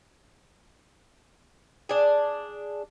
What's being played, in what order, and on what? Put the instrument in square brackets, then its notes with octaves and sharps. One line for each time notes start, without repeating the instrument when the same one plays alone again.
[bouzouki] D4 G#4